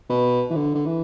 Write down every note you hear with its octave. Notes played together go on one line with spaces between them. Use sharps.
B2
E3
D3
D3
E3